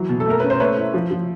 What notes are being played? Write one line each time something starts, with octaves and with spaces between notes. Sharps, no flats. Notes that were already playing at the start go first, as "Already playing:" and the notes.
Already playing: E3 F#3
B2
A4
A3 A#4
C#4 B4
C5
A3 B4 C#5
E4
F3
F3